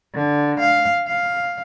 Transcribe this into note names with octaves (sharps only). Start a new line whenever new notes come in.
D3
F5
F5